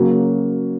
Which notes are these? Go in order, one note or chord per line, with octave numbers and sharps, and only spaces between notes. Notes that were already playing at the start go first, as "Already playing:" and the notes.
Already playing: C#3 F#3 A#3 F#4